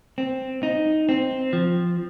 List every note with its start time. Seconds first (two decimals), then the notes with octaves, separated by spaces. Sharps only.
0.18 C4
0.63 D#4
1.09 C4
1.53 F3